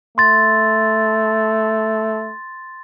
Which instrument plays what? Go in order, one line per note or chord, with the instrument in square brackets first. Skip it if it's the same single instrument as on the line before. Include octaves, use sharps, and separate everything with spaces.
[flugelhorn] A3 [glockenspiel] C6 A6